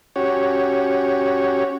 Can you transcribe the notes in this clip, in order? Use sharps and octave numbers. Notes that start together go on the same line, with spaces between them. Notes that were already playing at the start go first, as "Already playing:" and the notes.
C#4 F#4 G4 C#5